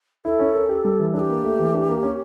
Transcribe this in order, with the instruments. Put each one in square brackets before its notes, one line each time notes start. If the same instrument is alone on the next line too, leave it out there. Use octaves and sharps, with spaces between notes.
[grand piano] E4 [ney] A4
[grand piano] C#4
A#4
G4
G3
E3
[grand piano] D4 [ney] A4
[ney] G4
[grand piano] A#3
A3
E3
D4
A#3
C#4